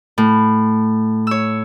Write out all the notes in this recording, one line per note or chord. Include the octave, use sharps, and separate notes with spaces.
A2
C#5 E6